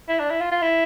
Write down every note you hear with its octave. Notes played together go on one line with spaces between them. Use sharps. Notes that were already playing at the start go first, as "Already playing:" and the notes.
E4
D4
E4
F4
F4
E4